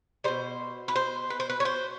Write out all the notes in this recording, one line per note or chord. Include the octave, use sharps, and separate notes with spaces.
B2 G3 C5
B4
C5
B4
C5
B4
C#5
C5